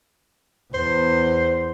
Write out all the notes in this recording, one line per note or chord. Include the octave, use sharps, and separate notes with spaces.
E2 C5